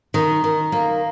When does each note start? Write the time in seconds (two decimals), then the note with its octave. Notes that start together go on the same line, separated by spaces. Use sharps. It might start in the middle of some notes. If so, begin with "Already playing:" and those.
0.14 D#3
0.44 D#3
0.72 A#3